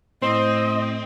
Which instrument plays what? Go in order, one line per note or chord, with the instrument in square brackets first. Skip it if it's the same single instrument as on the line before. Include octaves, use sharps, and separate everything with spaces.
[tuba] A2 [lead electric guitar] C4 [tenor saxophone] C5 [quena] D#5